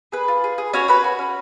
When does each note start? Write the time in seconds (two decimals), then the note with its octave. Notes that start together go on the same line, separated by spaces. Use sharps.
0.12 G#4 B4
0.28 F4
0.44 G#4
0.58 G#4
0.73 C#4 F#4 C#5
0.88 F#4 B4 B5
1.04 F#4
1.19 C#4